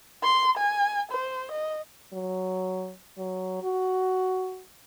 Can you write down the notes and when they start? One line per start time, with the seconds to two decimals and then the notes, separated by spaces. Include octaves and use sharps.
0.23 C6
0.57 G#5
1.12 C5
1.51 D#5
2.13 F#3
3.18 F#3
3.63 F#4